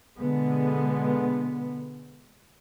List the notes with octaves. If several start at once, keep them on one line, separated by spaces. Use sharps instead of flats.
B2 D3 G#3 B3